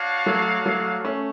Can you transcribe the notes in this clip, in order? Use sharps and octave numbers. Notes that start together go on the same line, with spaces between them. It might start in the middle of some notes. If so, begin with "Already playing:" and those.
Already playing: D4 F#4 C#5 F5
F#3 A3
F#3 A3
A3 C#4